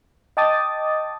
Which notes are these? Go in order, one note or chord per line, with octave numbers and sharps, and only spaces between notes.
D#5 G5 A5 D6 D#6 A6